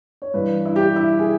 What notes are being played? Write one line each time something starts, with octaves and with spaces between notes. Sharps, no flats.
C#5
G2 E3 B4
E4
G4
E4
G#4